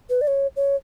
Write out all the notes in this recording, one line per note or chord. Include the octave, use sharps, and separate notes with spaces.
B4
D5
C#5
C#5